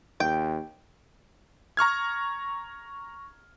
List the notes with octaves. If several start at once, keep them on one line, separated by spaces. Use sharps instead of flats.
D#2 G5
A#5 C#6 F6 G#6